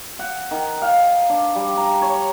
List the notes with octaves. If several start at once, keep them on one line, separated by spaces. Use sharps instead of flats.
F#5
D#3
F5
D4
G3
A#5
C#5